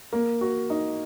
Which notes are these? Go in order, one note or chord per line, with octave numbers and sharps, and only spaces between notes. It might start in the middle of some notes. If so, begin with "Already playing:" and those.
A#3
F#4
D#4